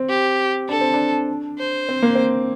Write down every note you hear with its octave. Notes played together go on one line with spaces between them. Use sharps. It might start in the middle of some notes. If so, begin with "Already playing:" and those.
Already playing: C4
G4
D4 A4
C4
D4
C5
C4
A#3
C4